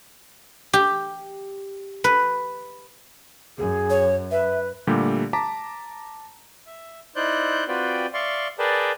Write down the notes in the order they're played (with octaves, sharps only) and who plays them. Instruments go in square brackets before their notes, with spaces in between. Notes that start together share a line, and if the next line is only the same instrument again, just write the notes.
[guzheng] G4
B4
[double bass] F#2 [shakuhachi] G#4
[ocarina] C#5
[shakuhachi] B4 [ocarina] E5
[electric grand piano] A#2 D3 G3 A3 G4
A5 A#5 D6 B6
[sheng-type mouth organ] E5
D#4 E4 C5 D5 F#6 G6
C4 F4 F#4 B4 D5 G5
D5 E5 F5 C6 C#6
G#4 A#4 B4 D5 G5 A5